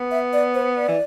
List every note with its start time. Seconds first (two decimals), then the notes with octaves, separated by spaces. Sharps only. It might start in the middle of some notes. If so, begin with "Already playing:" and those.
Already playing: B3
0.11 E5
0.33 D5
0.54 C5
0.76 D5
0.88 E3